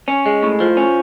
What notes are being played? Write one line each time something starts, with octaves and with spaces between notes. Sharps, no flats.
C#4
G#3
A2
F3
C#4